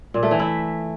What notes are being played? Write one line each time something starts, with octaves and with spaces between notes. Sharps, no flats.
A#2
A3
E3
E4